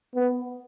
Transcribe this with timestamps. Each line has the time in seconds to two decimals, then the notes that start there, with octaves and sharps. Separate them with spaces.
0.15 B3